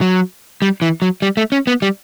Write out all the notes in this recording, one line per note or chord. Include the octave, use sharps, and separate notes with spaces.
F#3
G3
E3
F#3
G3
A3
C#4
B3
G3